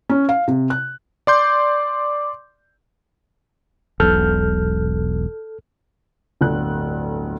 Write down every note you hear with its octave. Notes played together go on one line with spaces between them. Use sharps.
C#4
F5
C3
F#6
D5 C6 D6 G6
E1 B1 A4 F6 G6
D1 G1 F#6